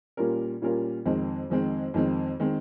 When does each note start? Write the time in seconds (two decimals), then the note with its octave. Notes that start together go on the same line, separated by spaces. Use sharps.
0.17 A#2 G3 C#4 F4 A#4
0.62 A#2 G3 C#4 F4 A#4
1.06 F2 D#3 G#3 C4
1.50 F2 D#3 G#3 C4
1.94 F2 D#3 G#3 C4
2.40 D#3 G#3 C4